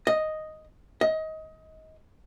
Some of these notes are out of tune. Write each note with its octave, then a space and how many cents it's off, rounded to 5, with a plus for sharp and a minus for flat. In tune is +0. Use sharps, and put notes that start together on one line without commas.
D#5 +0
D#5 +25